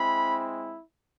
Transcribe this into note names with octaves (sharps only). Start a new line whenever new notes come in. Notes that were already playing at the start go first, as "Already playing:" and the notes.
Already playing: G#3 C4 E4 B5